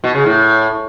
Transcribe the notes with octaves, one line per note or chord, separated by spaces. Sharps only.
B2
C#3
A2